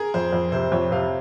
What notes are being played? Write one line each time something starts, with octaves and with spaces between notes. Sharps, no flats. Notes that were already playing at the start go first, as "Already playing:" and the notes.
Already playing: G#4 A#4
F2 C5
F2
C3 C5
F2 C#5
C3 F5